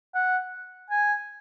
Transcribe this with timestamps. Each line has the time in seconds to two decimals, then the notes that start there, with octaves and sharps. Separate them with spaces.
0.15 F#5
0.90 G#5